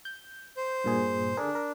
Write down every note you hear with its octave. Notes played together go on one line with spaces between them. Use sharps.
G6
C5
G2 A#2 G#4
D3 D4 G#4 A#4
A#4